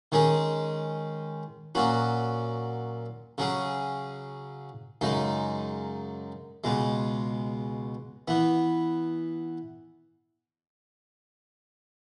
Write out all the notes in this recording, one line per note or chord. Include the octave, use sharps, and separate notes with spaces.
D#3 G#3 C#4 G#4
A#2 F#3 C#4 F#4
C#3 F#3 C#4 G#4
F#2 C#3 G#3 D#4
C#2 B2 G#3
E3 B3